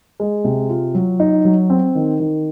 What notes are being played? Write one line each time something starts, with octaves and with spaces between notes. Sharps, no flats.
G#3
C3
F4
F#3
D#4
F#3
C4
D#3
D#3